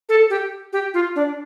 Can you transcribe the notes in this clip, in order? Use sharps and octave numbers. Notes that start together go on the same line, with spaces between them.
A4
G4
G4
F4
D4